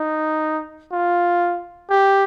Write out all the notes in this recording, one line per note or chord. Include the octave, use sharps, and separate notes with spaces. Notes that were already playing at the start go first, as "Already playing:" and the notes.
Already playing: D#4
F4
G4